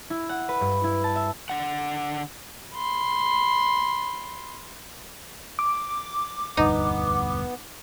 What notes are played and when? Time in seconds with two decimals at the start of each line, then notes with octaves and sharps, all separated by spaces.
0.10 E4
0.29 F#5
0.49 B4
0.61 G2
0.84 E4
1.04 A5
1.16 E5
1.49 D3 F#5
2.75 B5 C6
5.59 D6
6.57 E1 D2 G2 B3 D#4